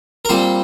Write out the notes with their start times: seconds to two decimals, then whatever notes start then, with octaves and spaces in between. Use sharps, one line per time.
0.25 A#4
0.29 A#2 G3 C4 C5